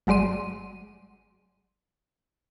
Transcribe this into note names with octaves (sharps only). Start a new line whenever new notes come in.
G1 F#3 G#3 D5 C6 D#7